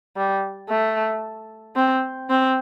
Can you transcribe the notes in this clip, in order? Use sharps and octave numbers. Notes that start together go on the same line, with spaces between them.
G3
A3
C4
C4